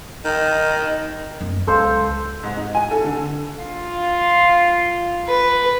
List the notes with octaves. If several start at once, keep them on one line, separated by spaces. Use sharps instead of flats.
D#3 D#5
F#2 B3
C#2 A4 C5 F5
G#2
D#4
G#5
A4
D3
F4
B4